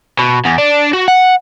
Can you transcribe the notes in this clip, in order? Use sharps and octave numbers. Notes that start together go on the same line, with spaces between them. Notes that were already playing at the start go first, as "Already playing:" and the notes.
B2
E2
D4
F#4
F#5